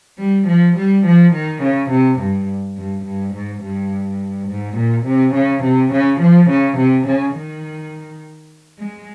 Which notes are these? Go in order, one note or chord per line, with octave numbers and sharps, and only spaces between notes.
G3
F3
G3
F3
D#3
C#3
C3
G2
G2
G2
G#2
G2
G#2
A#2
C3
C#3
C3
C#3
F3
C#3
C3
C#3
D#3
G#3